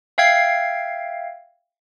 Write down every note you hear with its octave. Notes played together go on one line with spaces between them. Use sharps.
E5 F5 G5 G#6 C7